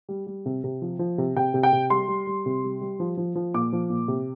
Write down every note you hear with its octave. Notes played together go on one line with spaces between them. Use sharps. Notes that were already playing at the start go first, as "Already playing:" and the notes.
G3
G3
C3
C3
F3
F3
C3
C3 G5
C3
G5
C3
G3 C6
G3
G3
C3
G3
G3
F3
F3
F3
A#2 D6
F3
A#2
C3